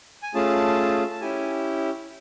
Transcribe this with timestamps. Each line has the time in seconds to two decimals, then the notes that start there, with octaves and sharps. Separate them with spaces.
0.23 G#5
0.34 A3 C#4 F4 G#4 A5
1.12 A5
1.21 C#4 E4 G4 G#5